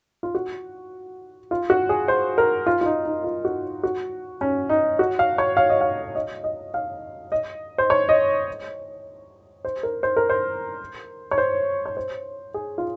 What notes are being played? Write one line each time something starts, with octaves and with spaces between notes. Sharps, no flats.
F4
F#4
F4
F#4
G#4
C5
A#4
F4
F4
D#4
D#4
F4
F#4
F#4
C#4
D#4
F#4
F5
C#5
F5
D#5
F5
D#5
D#5
F5
D#5
C5
C#5
D#5
C5
A#4
C5
A#4
C5
C#5
C5
C#5
C5
G#4
F4